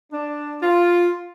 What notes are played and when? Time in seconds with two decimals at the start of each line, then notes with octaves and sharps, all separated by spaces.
0.12 D4
0.62 F4